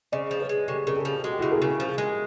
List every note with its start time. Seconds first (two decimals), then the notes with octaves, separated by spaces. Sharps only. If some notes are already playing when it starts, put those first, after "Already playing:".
0.12 C#3 C5 D5
0.31 F3
0.40 B4 C#5
0.49 G#3
0.68 C#3 G4 A4
0.87 C#3 A#4
0.96 G4 A4
1.05 F3
1.24 G#3 F#4
1.32 G4
1.39 C#3 E4 F#4
1.52 G#4 A#4
1.62 C#3
1.80 F3
1.98 G#3